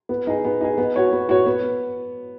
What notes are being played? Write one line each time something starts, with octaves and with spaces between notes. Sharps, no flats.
B3
D#4 G#4
B3
D#4 G#4
B3
F#4 C#5
B3
F#4 C#5
B3